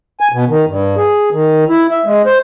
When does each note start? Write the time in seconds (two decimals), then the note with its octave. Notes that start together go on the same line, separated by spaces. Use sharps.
0.20 G#5
0.32 B2
0.48 D#3
0.67 G2
0.96 G#4
1.32 D#3
1.69 E4
1.91 E5
2.06 G#3
2.26 C5